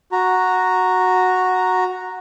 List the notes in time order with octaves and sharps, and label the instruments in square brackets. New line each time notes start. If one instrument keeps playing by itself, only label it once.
[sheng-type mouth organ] F#4 A#5